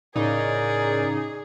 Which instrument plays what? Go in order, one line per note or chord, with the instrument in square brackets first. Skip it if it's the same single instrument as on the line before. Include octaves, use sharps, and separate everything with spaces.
[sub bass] A2 [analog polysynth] C#3 D#4 [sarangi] G#4 [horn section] A#4 C#5 D5